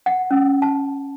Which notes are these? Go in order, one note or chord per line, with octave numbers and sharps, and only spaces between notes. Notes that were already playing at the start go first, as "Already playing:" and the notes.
F#5
C#4
A5